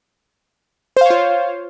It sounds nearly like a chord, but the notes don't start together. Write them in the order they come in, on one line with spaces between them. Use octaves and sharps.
C5 F5 C#5 F4